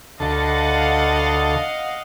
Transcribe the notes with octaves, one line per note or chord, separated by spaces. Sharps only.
D2 A4 D#5 F5 F#5